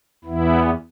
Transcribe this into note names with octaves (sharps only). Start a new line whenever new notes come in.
E2 E3 B3 E4